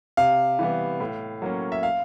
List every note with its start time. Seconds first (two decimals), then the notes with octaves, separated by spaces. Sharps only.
0.17 C3 F5
0.59 E3 G3 B3
1.00 A2
1.42 F#3 A#3 C#4
1.72 E5
1.83 F5